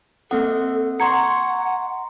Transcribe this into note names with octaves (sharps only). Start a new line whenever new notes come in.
A#3 C4 A4 D#5 F#5
F#5 A#5 C6 C#6 G#6 C#7